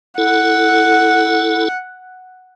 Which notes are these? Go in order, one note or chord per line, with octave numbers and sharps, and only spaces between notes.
E4 A4 F#5